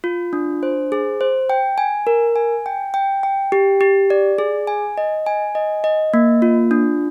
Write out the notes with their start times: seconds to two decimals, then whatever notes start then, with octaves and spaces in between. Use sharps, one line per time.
0.04 F4
0.33 D4
0.63 C5
0.92 G#4
1.21 C5
1.50 G5
1.78 G#5
2.07 A#4
2.36 G#5
2.66 G5
2.94 G5
3.23 G5
3.52 G4
3.81 G4
4.10 D5
4.38 G#4
4.67 G#5
4.98 D#5
5.26 G#5
5.55 D#5
5.84 D#5
6.14 A#3
6.42 F4
6.71 D4